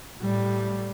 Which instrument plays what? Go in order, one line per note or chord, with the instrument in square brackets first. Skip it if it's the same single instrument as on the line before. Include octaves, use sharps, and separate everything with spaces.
[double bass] A2 G3